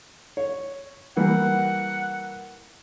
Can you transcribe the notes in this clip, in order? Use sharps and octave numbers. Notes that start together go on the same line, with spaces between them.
C#5
E3 G3 A#3 F#5